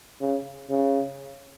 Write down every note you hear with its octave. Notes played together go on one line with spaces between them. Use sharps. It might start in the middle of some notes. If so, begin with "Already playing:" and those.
C#3
C#3